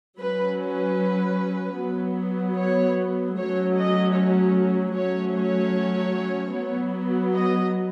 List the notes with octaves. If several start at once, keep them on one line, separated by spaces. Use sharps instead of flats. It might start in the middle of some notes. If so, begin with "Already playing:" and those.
F#3 C#4 B4
B4
F#3 B3
C#5
F#3 A3 C#4 C#5
D#5
C#5
F#3 A3 C#4 C#5
C#5
F#3 B3
D#5